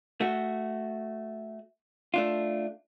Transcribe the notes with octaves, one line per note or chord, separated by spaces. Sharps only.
A3 F#4
A3 D4 F4